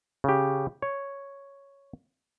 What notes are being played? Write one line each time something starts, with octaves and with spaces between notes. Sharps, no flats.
C#3 G4
C#5